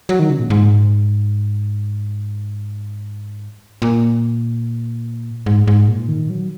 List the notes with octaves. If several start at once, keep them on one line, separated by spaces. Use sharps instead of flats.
F#3
D#3
C#3
A#2
G#2
A#2
G#2
G#2
A#2
D#3
F#3